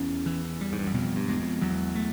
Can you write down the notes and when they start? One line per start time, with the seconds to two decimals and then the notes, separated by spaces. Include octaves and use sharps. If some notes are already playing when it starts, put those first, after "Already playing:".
Already playing: E2 C#4
0.26 E3
0.61 G3
0.73 G#2
0.79 G2
0.87 F#2
0.94 F2 B2
1.16 G2
1.28 E2 G#3
1.40 F2
1.61 E2 F#3
1.95 A3